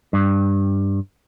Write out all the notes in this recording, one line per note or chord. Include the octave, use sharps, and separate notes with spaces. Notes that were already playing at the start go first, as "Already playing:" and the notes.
G2